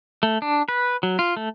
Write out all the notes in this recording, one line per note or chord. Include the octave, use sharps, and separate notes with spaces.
A3
D4
B4
F#3
F4
A3